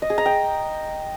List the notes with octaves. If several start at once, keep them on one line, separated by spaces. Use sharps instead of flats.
D#5
G#4
A#5
G5